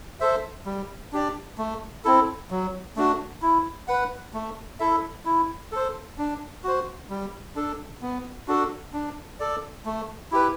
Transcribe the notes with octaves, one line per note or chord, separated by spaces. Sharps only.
A4 C5 E5
G3
D4 G4 D5
A3
C4 E4 A4
F#3
A3 D4 F#4
E4
B4 F#5
A3
E4 A4 E5
E4
A4 C5
D4
F#4 C5
G3
D4 A4
B3
D4 F#4 A4
D4
A4 D5
A3
E4 G4 B4